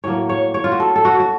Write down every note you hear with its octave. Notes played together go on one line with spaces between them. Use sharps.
A2 F#3 A#3 C#5
C#5
C#5
F4
F#4
A4
A4
F#4
F#4